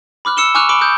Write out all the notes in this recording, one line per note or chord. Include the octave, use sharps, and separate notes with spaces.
B5 D6 F6 F#6
E6 C#7 E7 G7
G#5 C#6 D6 F6 F#6 F7
B5 D6 D7 G7
D6 D#6 F#6 G6